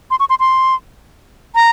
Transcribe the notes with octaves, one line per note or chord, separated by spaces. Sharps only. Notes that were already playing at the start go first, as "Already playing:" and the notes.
C6
C#6
C6
C6
A#5